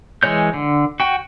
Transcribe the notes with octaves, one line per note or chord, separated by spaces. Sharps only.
E3 G#3 C#5 G6
D3
F#4 G5